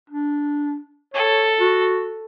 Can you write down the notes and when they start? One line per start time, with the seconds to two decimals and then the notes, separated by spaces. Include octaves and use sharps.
0.10 D4
1.14 A4 C#5
1.60 F#4